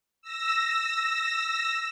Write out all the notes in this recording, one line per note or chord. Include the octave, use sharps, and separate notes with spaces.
E6 A#6